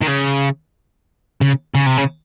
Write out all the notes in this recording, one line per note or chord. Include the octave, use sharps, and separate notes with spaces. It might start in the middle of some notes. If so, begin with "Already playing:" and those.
D#3
C#3
C#3
C#3
C3
C#3